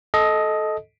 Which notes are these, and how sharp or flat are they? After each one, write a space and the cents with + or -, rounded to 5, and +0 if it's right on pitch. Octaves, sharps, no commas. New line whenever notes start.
A4 -15 D#5 +10